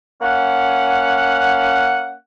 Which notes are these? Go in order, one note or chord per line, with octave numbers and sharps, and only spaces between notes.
A#3 C#4 F#5